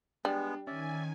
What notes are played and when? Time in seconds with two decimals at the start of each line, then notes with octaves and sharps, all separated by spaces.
0.25 G3 G#3 B3 D4
0.67 D#3 C#4 D5 E5 G#5